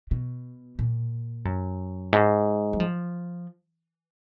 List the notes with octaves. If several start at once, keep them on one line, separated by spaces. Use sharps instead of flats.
B2
A#2
F#2
G#2
F#3
F3